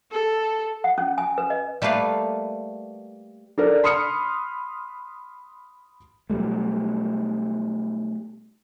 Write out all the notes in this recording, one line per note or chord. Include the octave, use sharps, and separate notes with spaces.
A4
F#5
C#4
G#5
B4
D#5
G3 A3 A#3 B4 F5
D4 A4 A#4 D5
B5 C6 D#6 F6 C#7
B2 F#3 G3 A3